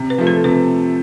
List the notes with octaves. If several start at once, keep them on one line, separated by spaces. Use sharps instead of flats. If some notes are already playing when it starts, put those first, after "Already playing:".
Already playing: C3
B4
F3 A3
A4
C3 B4